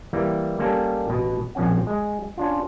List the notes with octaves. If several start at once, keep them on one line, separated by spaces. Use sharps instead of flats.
E3 G3 A#3
G3 A#3 C#4 A4
A1 B2
A#1 F3 C4 C#4 F#5
G#3
C#4 D4 F4